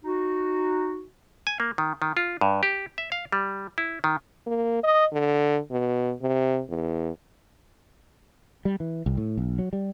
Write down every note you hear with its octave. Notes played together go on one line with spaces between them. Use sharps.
D#4 F#4
G#5
A#3
D#3
D#3
F4
G2
G4
E5
F5
G3
E4
D#3
A#3
D#5
D3
B2
C3
E2
G3
E3
C2
A2
B1
F#3
G3